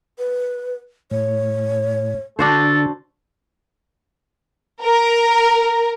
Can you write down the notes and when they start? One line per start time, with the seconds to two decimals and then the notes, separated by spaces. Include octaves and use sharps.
0.18 B4
1.11 A2 C#5
2.39 D3 D4 F#4 A4 C5
4.83 A#4